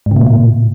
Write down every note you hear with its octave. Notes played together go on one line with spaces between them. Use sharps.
G#2
C#3
A#2
A2
A#2